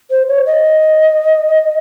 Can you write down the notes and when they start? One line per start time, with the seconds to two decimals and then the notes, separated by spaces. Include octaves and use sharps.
0.10 C5
0.28 C#5
0.46 D#5